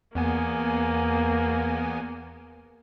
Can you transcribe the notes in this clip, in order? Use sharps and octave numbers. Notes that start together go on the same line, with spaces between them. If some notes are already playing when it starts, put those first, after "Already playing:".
E2 A#3 B3 G#5